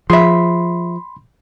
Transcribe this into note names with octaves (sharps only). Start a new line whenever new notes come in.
F3 G#4 E5 B5 C6